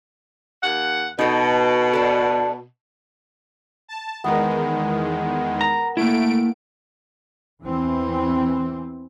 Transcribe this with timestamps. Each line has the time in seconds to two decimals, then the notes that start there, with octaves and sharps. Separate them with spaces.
0.63 D#2 F#5
1.19 B2 D#4 A4
1.93 D4 A4
3.88 A5
4.24 E2 D#3 G#3 B3 A#4
5.61 A#5
5.97 A3 A#3 E4 D7
7.64 E2 E3 C4